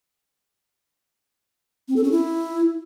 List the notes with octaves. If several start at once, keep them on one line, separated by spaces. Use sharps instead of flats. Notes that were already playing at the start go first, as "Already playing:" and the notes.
C4
A4
C#4
E4